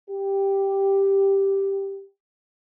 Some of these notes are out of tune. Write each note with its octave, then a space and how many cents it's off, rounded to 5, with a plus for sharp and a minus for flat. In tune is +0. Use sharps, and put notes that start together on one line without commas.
G4 +0